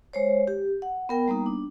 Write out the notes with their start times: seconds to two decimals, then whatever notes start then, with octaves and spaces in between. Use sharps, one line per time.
0.13 G#3 C5 C#5
0.48 G4
0.82 F#5
1.09 B3 A#4 G5
1.28 G3 A#3 B3 D#4
1.46 D4